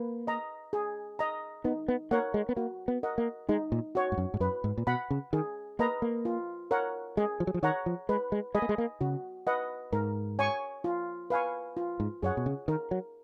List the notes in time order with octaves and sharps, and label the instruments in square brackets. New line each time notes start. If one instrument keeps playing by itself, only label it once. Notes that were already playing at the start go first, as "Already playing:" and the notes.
Already playing: [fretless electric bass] A#3 [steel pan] B4
[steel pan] D#5 A#5
G#4
D#5 A#5
[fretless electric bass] B3 [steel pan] D#4
[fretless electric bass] B3
[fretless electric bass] A#3 [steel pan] A#4 C#5 F#5
[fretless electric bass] G#3
B3
[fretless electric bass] A#3 [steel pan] F#4
[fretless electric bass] B3
[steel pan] A#4 D#5 F#5
[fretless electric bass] A#3
[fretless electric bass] G#3 [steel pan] D#4
[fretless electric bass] A#2
[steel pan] F#4 C#5
[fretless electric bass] G#2
F#2
G#2
[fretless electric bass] F#2 [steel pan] B4
[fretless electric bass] G#2
A#2
[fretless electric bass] B2 [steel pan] F#5 B5
[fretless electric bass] C#3
[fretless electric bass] D#3 [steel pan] G#4
[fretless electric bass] A#3 [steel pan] B4 D#5 A#5
[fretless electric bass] A#3
[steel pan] F4
A#4 C#5 F#5
[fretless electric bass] G#3 [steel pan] G#4
[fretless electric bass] F3
F#3
F3
[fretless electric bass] D#3 [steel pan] C#5 F#5 A#5
[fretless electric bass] F3
[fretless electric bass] G#3 [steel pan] B4
[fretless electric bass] G#3
[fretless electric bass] G#3 [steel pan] D#5 G#5 B5
[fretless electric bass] A#3
G#3
A#3
[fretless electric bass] C#3 [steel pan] F#4
[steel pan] B4 D#5 F#5
[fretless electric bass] G#2 [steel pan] A#4
[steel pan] C#5 G#5 C#6
F4
B4 F5 G#5 C#6
F4
[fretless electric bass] G#2
[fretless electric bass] F#2 [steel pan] G#4 C#5 F#5
[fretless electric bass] B2
C#3
[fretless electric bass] D#3 [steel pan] A#4
[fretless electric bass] F#3